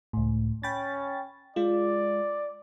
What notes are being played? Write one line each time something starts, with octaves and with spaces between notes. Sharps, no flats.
C#2 A2
C#4 G5 B5 A6
G#3 F4 D5